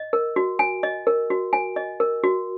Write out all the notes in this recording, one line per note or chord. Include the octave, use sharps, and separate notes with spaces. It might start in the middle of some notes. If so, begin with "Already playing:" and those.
Already playing: D#5
A#4
F#4
G#5
D#5
A#4
F#4
G#5
D#5
A#4
F#4